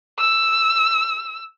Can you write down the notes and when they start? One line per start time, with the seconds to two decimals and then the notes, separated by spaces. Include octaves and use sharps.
0.19 E6